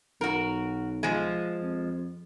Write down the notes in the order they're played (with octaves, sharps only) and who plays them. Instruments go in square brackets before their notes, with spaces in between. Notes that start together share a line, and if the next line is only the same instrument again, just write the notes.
[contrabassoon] B1 [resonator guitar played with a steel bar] F#4 A#4
[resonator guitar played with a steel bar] F3 G#3
[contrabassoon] F2